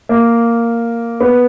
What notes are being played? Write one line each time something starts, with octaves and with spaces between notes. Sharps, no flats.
A#3
B3